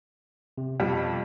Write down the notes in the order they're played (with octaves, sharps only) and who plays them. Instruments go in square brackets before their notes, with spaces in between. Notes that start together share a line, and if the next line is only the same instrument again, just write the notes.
[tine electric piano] C3
[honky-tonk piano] F2 G3 [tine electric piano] B2